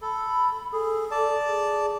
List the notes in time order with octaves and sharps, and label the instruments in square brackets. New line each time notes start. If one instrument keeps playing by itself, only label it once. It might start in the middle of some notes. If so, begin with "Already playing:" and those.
[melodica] A4 [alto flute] B5
[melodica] G#4 [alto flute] A4
[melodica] D5 A5
[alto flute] G#4